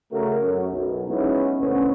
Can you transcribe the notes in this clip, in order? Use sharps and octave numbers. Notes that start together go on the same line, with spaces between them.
C#3 A3 F#4 A#4
F#2
B1
G#3 B3 C#4 D#4 E4
D2 B2 B3 C#4